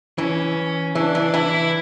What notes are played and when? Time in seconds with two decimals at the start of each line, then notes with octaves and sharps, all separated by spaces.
0.18 E3 C#4
0.95 E3 D4
1.15 E3
1.34 E3 E4